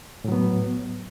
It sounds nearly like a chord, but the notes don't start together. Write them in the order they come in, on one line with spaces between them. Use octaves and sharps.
A2 F#3 B3